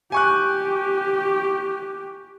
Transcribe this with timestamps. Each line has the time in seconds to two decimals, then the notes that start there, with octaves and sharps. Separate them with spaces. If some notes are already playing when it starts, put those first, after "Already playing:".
0.12 G4 G#5 C#6 F#6